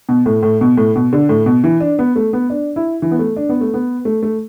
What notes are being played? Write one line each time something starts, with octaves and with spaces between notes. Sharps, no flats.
B2
A2
A2
B2
A2
B2
D3
A2
B2
E3
D4
B3
A3
B3
D4
E4
E3
B3
A3
D4
B3
A3
B3
A3
A3